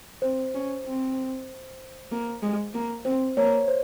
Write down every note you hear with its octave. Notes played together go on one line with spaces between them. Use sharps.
C4 C5
C#4
C4
A#3
G#3
A#3
C4 C5
A#3 C#5
C5